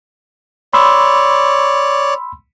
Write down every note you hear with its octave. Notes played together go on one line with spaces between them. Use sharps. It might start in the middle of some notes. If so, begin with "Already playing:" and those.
C#5 D5 B5 C6 E6